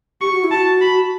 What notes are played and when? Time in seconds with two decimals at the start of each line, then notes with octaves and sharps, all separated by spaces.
0.21 G4 C#6
0.32 F#4
0.44 E4
0.51 F#4 A5
0.81 B5